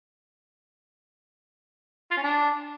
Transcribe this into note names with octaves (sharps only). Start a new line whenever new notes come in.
F4
C#4
D4